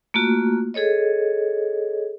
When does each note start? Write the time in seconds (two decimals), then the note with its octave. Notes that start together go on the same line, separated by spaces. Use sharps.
0.14 A3 A#3 F4 F#4
0.74 G#4 A4 C#5 D#5